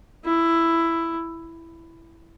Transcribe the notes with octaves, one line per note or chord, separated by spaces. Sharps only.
E4